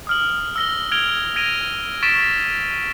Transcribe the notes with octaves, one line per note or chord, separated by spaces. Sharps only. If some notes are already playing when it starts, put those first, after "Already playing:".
D#6 F6 F#7
E6 A#6 G7
F6 G#6 D7 F7 G7
G#6 A#6 D7 D#7 F7
C#6 A6 B6 D7 E7